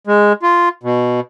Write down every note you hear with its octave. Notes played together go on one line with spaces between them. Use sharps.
G#3
F4
B2